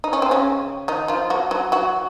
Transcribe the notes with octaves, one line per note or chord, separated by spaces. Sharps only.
D#4
C#4
C4
C#3 C#4
D#3 D#4
F3 F4
F#3 F#4
F#3 F#4
F#3 F#4